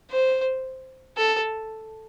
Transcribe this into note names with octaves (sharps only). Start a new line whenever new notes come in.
C5
A4